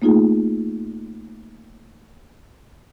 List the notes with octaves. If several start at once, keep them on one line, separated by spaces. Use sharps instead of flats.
A3 A#3 D#4 F4 G#4